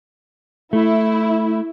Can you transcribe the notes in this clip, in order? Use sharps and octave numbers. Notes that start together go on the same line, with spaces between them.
A3 E4